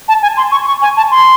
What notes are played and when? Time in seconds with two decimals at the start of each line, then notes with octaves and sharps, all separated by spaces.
0.08 A5
0.22 G#5
0.37 C6
0.52 C#6
0.66 C#6
0.82 G#5
0.97 A5
1.11 C6